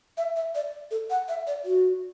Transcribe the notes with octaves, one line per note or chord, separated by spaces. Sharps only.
E5
E5
D5
A4
F#5
E5
D5
F#4